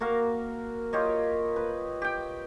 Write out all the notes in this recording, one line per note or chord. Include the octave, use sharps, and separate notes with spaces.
A#3 F#4 A#4 F5
F4 G4 C#5 D#5
B4
G4 G5